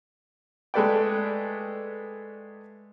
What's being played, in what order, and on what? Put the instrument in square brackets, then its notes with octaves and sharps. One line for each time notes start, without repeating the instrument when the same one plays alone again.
[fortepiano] G#3 A3 A4 B4 D5 G5